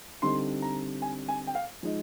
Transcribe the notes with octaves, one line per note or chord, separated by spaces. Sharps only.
D3 G3 C4 D#4 C6
A#5
G#5
G#5
G5
F5
F3 G#3 D#4